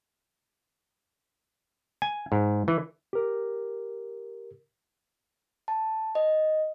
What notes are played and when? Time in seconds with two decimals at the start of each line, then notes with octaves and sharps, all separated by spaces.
2.02 G#5
2.32 G#2
2.68 E3
3.13 G4 A#4
5.68 A5
6.15 D#5